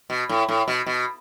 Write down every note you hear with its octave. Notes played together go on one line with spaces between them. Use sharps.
B2
A2
A2
B2
B2